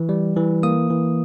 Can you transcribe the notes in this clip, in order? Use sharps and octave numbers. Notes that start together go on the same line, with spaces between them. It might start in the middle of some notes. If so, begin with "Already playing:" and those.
Already playing: E3
G3
E3
A#3 D#6
E3